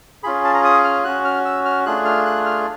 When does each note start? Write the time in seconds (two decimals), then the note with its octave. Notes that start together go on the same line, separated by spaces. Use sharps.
0.23 C#4 F4 G#4 B5
0.45 A5
0.54 A#5
0.64 D#6
0.84 F6
1.05 C#4 F#4 F#6
1.25 F6
1.45 E6
1.65 F6
1.86 A3 D4 F4 G#4 F#6
2.05 F6
2.26 F#6
2.46 F6